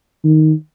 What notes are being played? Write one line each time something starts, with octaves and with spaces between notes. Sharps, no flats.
D#3